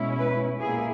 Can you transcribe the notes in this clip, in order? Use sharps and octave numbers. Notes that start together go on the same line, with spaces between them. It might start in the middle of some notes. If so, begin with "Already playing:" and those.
Already playing: B2 G#3 C#4 E4
B4
A#2 A#3 E4 G#4